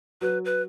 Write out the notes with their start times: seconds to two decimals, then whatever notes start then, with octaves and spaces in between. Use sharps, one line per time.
0.21 F#3 B4
0.45 B4